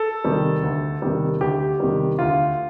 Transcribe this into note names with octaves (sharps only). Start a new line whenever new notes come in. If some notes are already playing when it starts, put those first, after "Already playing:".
Already playing: A4
C3 D#3 G3
D2
C3 D#3 G3
D2 G4
C3 D#3 G3
D2 F4